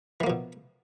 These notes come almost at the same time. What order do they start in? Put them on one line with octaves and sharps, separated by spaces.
E3 A#3 F3 B2